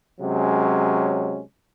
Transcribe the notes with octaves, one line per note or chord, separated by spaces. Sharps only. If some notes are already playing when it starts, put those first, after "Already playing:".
C3 F#3 G#3 C#4